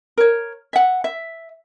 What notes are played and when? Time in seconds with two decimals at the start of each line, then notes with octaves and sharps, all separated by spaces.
0.18 A#4 C#5
0.73 E5 F#5
1.04 E5